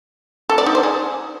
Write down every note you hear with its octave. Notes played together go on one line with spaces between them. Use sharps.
A4
D5
D#4
C5
G#4